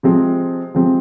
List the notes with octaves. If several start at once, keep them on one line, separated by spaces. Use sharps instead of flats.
C3 F3 G#3 C4
C3 F3 G#3 C4